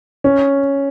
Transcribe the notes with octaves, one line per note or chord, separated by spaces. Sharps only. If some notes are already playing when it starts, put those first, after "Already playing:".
C#4